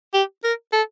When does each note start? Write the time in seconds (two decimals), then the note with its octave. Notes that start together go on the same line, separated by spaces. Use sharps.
0.14 G4
0.44 A#4
0.73 A4